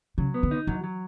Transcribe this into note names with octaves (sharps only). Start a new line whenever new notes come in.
C#3 F#3
B3
D3
D#4
E3 F#3
F#3